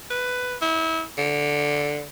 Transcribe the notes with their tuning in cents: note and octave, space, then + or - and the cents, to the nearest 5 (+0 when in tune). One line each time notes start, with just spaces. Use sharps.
B4 +10
E4 -30
D3 -5